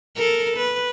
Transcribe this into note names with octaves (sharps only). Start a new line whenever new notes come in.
A4 A#4
B4